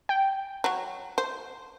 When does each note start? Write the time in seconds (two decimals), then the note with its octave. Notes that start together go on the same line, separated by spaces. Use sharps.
0.09 G5
0.64 F#3 C#5
1.18 C5